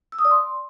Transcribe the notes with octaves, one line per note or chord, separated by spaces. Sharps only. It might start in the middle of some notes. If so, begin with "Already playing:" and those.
E6
D#6
D5
C6